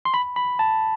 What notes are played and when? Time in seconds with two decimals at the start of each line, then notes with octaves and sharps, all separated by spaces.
0.05 C6
0.14 B5
0.36 B5
0.59 A5